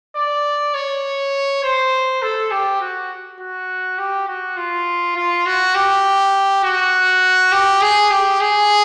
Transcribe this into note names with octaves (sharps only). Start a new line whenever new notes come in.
D5
C#5
C5
A4
G4
F#4
F#4
G4
F#4
F4
F4
F#4
G4
F#4
G4
G#4
G4
G#4